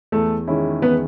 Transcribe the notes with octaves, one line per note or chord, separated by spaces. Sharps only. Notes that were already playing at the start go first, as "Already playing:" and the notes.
E2 A3 A4
D#3 G#3 C#4 E4
E2 B3 B4